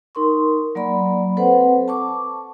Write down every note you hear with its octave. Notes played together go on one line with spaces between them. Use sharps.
D#4 A#4 C6 C#6
F#3 A#3 D5 B5
C4 A4 B4 C5 F#5
A5 C#6 D6